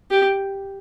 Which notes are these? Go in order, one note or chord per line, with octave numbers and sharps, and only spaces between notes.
G4